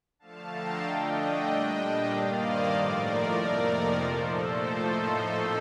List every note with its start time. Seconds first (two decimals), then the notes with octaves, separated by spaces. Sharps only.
0.19 D3 F3 A3 F5 A5
0.51 G5 A#5
0.82 D3 A3 D4 D#5 G5
1.45 A#2 G3 D4
2.08 G2 D#3 A#3 D5 F5
2.40 C5 D#5
2.71 A2 F3 A3 A#4 D5
3.34 F2 C3 F3 A#3 D#4
3.97 A#2 F3 A3 A4 C5
4.28 A4 C5
4.59 A2 F3 A3 D#4 A4 C5
5.23 A#2 A3 C4 D#4